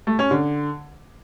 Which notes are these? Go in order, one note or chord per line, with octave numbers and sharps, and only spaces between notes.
A3
C#4
D3